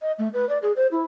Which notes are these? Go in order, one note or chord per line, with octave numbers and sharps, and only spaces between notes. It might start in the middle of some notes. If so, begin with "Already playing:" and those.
D#5
A3
B4
D5
G#4
C5
E4